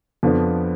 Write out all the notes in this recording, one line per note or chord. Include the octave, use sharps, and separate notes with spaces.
F2 F3 B3 D4